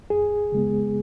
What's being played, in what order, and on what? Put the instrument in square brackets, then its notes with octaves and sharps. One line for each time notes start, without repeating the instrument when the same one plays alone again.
[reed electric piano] F#2 G#4
C#3 G#3 B3